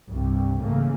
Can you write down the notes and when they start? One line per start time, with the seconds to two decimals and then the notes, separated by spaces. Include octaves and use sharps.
0.11 C2 G2 C3
0.61 G#2 C#3 E3 A3 A#3